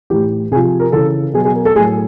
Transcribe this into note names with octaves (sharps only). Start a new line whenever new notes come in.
A2 E3 G4
C3 F3 G#4
A#4
C#3 E3 A4
B2 F#3 G#4
G#4
A#4
A4
A2 F#3 G#4